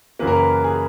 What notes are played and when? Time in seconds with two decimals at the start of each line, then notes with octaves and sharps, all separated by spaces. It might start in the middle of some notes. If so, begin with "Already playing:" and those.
0.19 F#2 C#3 E3 A#3 B4
0.27 A#4
0.36 B4
0.64 G#4